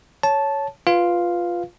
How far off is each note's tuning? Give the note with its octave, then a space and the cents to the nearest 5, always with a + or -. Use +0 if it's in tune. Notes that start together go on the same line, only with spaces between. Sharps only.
C#5 +5 A5 -10
F4 +0 B4 +0 F5 +0